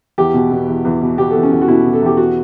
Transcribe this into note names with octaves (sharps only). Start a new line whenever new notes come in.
E2 G4
B2
B2
E2
E2
B2
B2 G4
A4
E2
C#4
E2
F#4
B2 E4
B2
A4
E2 G4
F#4